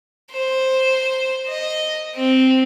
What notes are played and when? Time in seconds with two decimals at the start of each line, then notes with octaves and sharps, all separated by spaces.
0.32 C5
1.48 D#5
2.15 C4